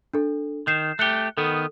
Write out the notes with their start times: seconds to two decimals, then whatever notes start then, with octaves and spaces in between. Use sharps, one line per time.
0.14 D4 A4
0.67 D#3 G6 C7 E7
0.99 A3 G4 F#6 C#7 G7
1.37 D#3 B3 A4